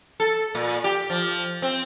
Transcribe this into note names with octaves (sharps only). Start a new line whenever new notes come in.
A4
A#2
G4
F3
C4